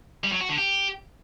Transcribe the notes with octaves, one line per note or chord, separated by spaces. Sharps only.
G3
F#3
F#4
D3
G4